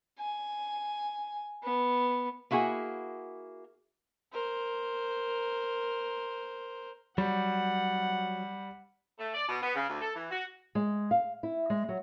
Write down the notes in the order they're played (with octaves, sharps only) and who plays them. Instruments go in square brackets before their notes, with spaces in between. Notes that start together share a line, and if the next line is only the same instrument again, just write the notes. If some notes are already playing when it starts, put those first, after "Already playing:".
[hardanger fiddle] G#5
B3
[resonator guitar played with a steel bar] A#3 E4 F#4 G#4
[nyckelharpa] A#4 C5
[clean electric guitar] F#3 [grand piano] G3 [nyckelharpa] F#5
[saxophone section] A3
D5
B2
B3
C#3
D2
A4
E3
F#4
[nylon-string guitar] G#3
F5
E4
G#3
F#3